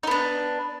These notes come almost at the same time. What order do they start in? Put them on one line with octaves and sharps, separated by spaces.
D#4 B3 D4